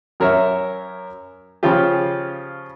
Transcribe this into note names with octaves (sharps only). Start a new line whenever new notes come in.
F#2 A#4 C#5 E5
C#3 F3 C#4 F4 G4